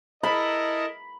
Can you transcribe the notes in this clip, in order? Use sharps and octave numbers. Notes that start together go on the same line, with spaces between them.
E4 A4 A#4 D#5 B5